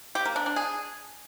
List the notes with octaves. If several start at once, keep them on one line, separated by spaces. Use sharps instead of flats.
G4
A#3
D4
D4
G#4